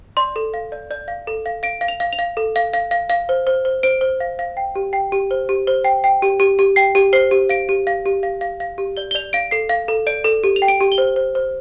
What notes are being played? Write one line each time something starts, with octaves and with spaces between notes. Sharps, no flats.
D5 C6
A4
F5
D5
D5
F5
A4
F5
F5 D7
F5
F7
F5
F7
F5
A4
F5
F5
F5
F5
C5
C5
C5
C5 D7
C5
F5
F5
G5
G4
G5
G4
C5
G4
C5
G5
G5
G4
G4
G4
G5 C7
G4
C5 C7
G4
F5 D7
G4
F5
G4
F5
F5
F5
G4
D5 G7
G7
D5 F7
F5 D7
A4 C7
F5
A4
D5 D7
A4
G4
F7
G5
D7
G4
G7
C5
C5
C5